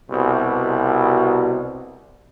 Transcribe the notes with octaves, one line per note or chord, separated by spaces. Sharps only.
C2 B2